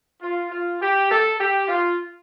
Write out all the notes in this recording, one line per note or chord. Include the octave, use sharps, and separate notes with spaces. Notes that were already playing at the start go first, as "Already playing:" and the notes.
F4
F4
G4
A4
G4
F4